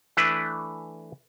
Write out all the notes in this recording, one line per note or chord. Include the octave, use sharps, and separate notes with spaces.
E3 A3 D4 E4 B4